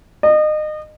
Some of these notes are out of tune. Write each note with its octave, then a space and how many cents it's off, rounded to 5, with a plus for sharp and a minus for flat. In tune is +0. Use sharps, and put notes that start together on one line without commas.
D#5 -30